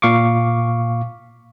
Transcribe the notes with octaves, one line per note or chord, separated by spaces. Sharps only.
A#2 F5 C#6 D6